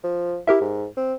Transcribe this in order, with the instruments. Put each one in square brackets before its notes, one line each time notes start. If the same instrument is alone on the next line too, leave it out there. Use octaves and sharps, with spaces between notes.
[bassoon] F3
[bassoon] E4 [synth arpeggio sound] G4 A#4 E5
[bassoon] G#2
C4